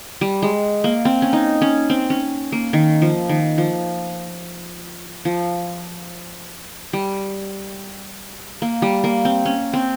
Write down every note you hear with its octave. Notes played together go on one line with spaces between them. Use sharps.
G3
G#3
A#3
C4
C#4
D#4
C#4
C4
C#4
A#3
D#3
F3
D#3
F3
F3
G3
A#3
G3
A#3
C4
C#4
C4